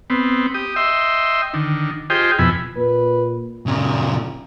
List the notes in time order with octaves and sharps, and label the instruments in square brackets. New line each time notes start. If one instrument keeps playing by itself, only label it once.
[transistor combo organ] B3 C4
G4 D#6
D#5 E5 G5 C6
D3 D#3
F4 G4 G#4 C5 D#5 G5
F2 B2 E4 G#5 B5
[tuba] A#2 [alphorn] B4
[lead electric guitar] A#2 C#3